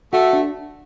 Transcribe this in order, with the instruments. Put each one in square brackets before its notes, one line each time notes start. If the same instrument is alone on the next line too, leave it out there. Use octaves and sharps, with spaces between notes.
[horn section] A3 [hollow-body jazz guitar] F#4
[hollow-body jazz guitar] D4